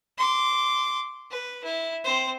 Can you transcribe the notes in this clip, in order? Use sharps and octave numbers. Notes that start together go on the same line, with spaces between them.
C6 D6
B4
E4
C4 C5